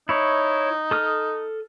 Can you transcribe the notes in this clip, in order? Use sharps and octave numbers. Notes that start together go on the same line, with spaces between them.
D#4 E4 C#5
A4 D#6 F6